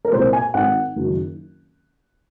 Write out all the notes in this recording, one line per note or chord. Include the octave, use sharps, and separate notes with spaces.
A#4
C2 A#2 C5
G#5
G#1 G#2 D#3 F#5
F#1 F#2 D#3